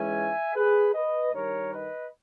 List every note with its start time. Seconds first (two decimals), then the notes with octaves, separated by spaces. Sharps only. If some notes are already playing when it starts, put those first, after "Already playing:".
Already playing: G#2 E3 G#3 C#4 E5 G#5
0.55 G#4 B4
0.94 B4 D#5
1.33 G2 D#3 G3 A#4 C#5
1.72 B4 D#5